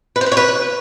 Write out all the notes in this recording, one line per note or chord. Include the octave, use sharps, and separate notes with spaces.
B4
C5
B4
C#5
B4